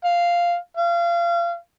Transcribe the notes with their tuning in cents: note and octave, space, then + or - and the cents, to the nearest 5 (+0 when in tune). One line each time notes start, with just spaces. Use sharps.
F5 -5
F5 -30